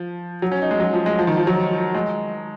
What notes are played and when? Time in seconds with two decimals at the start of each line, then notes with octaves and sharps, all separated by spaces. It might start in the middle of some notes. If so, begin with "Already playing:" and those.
Already playing: F3
0.42 F#3
0.52 C#4
0.62 D#4
0.71 G#3
0.80 F#3
0.94 F3
1.06 G#3
1.19 F3
1.27 D#3
1.37 F3
1.47 F#3
1.95 G#3